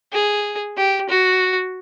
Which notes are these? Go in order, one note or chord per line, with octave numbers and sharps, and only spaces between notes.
G#4
G4
F#4